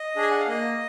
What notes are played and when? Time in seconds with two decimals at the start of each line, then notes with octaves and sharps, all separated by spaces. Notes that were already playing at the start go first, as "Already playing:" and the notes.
Already playing: D#5
0.16 D4 G#4
0.22 G#5
0.31 F#5
0.39 F5
0.48 A#3 D#5